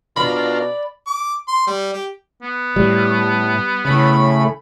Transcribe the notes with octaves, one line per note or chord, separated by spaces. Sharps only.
B2 D4 F4 A#4 D5 B5
D6
C6
G3
G4
B3
A2 G3
A2 C#3 A3 B5